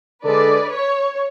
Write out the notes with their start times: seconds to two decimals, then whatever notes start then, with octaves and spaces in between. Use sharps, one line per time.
0.24 D3 G#3 D4 A4 B4 D5
0.69 C#5